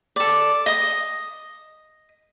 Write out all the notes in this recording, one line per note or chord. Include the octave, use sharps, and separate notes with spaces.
A4 D5
D#5 D#6